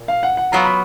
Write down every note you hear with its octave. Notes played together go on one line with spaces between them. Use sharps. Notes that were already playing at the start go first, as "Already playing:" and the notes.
Already playing: A#2
F5
F#5
F#5
F#3 B3 F4 A#5
B5